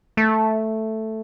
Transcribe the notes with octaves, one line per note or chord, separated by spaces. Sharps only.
A3